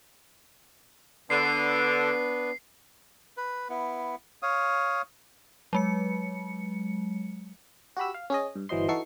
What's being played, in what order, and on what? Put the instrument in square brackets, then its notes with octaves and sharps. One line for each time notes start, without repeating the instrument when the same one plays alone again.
[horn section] D3 [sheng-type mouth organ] B3 D4 B4 [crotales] C7
[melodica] B4
B3 E4
C#5 F5 D#6
[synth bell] F#3 G#3 C#7
[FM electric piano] F#4 G4 B5 E6
F5
C#4 G#4 D#5
G2
G1 E3 F#3 C5 D#5 C6
E3 D#4 F#4 A4 C#6 C7